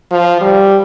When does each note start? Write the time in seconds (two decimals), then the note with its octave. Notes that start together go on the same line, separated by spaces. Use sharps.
0.11 F3
0.41 G3